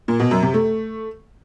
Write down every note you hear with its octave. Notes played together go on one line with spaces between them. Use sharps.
A#2
B2
F#2
C3
A3